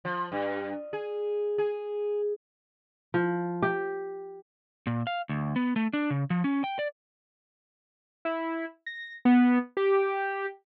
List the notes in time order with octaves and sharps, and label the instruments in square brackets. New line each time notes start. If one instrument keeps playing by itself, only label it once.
[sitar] F3
G2
G#4
G#4
[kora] F3
G4
[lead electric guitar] A#2
F5
D2
B3
A3
D4
C#3
F3
C#4
G5
D5
[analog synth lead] E4
A#6
B3
G4